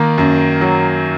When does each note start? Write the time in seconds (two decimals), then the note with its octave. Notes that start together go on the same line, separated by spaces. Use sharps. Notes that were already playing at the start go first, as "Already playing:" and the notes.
Already playing: D#3 A#3
0.18 F#2
0.61 F#3